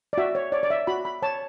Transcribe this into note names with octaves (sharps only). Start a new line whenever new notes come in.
D5
F#4 E5
C#5
C#5 D5
D5
E5
F#4 B5
B5
C#5 A5